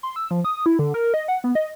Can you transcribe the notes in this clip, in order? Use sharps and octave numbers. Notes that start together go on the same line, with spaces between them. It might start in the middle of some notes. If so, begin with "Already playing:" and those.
C6
E6
F3
D#6
E4
D3
A#4
D#5
F#5
B3
D#5